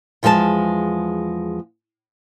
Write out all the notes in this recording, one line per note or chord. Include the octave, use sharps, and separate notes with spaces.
E2 F3 G#3 A#4 A5